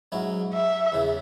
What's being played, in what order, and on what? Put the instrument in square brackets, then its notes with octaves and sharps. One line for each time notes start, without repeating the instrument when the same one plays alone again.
[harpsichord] G#2 F#3 C#4 E4
[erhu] E5
[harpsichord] E2 C#3 E3